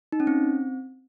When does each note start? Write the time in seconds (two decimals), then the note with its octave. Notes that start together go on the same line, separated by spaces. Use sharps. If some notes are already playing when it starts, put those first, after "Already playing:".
0.12 D#4
0.20 C#4
0.27 C4